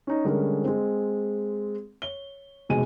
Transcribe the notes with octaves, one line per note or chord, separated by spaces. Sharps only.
C#4 D#4
D3 G3 G#3 C#4 A#4
G#3 C4
C#5 G7
F1 B2 G#3 C4 G#5 D#7